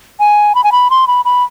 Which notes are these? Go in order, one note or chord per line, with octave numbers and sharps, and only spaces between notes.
G#5
B5
G#5
B5
C6
B5
B5